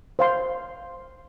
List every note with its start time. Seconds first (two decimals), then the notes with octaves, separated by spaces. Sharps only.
0.19 C5 F5 C6